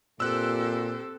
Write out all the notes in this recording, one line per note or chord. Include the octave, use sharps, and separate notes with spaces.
A#2 C4 G4 A4 C5 E6 F#6